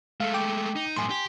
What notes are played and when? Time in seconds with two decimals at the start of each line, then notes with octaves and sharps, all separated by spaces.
0.20 G#3 A3 F5
0.34 G5 D6
0.76 D#4
0.97 F#2 A2 G#5 C6
1.10 G4